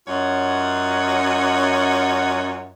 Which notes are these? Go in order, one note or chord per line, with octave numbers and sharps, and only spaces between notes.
F#2 F4 C#5 D#5 F#5